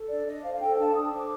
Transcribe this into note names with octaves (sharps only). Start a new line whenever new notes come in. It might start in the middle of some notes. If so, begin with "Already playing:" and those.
Already playing: A4
D4 D5
D4 D#5
C5 F5
F5
A4 G5
D4 A5
D4 D#6
C5 D6